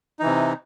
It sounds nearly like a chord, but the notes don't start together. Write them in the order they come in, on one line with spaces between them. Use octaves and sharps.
D#4 E3 C3